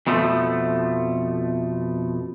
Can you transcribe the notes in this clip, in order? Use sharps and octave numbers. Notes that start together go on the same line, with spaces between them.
F2 B2 F3 A3